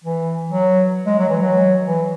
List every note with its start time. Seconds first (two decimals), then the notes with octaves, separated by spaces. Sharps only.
0.04 E3
0.50 F#3
1.06 G#3
1.19 F#3
1.29 E3
1.42 F#3
1.87 E3